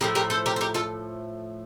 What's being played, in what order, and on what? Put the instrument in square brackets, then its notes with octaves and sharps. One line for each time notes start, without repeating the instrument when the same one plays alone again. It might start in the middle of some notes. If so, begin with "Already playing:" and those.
[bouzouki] A2 F3 A3 G4 A#4
G4 A#4
A4 C5
G4 A#4
C5
G4 A#4
F4 A4